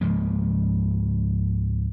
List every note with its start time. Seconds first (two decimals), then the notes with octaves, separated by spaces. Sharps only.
0.01 C#2 G#2 F3 A#3